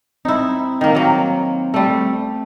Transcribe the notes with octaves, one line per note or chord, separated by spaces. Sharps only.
C4 D#4 E4
D#3 A#3
F#3 A#3
G3 A3